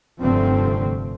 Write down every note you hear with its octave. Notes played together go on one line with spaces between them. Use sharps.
F1 G2 D3 F3 A3 C4